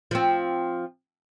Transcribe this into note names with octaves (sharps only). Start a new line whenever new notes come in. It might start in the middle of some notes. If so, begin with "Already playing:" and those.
F3 C4